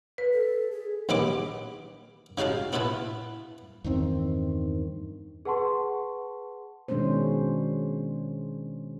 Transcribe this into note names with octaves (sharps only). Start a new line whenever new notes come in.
B4
A4
G#4
A#1 D#2 B3 D#5 B5 D6
C#3 D#4 F#4 F5 A5
B3 E4 F4 B4 A5
E2 G2 D#3 C4
G#4 B4 F#5 A5 C6 C#6
B2 D#3 G#3 C#4 D4 C5